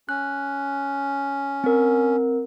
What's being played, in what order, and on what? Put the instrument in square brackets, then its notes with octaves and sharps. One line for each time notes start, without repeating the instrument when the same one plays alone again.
[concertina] C#4 [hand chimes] F#6
[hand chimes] C4 A#4